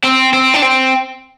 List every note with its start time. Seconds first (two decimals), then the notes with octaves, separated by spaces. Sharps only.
0.04 C4
0.33 C4
0.54 D4
0.62 C4